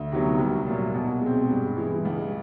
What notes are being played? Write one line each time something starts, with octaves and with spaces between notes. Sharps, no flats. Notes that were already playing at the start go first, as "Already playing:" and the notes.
Already playing: D2
C3 D#3 F#3 B3
C2
A#2 F#3
B2
G#3 C4
G2
E3 G#3
C#2